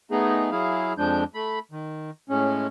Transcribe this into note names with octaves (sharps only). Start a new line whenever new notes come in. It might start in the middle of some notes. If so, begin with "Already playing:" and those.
A3 B3 D#4 G#4
F#3 E4 G#4 F5
F2 F3 G#3 D4 G6
A3 B5
D#3
A2 G#3 C#4